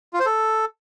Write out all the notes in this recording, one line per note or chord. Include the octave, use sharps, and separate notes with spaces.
F4
C5
A4